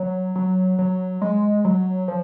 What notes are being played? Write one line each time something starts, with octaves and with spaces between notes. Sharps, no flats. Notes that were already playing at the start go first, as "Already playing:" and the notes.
Already playing: F#3
F#3
F#3
G#3
F#3
F3